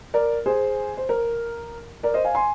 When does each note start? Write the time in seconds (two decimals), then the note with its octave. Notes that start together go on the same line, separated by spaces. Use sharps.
0.14 A#4 D5
0.46 G#4 C5
0.97 C5
1.09 A#4
2.03 A#4 D5
2.14 C5 D#5
2.25 F5 G#5
2.35 G#5 C6